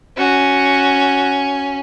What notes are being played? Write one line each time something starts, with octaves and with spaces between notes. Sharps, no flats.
C#4 F#4